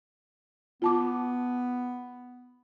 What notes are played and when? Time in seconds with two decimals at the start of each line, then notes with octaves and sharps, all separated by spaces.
0.82 B3 F4 A5 D6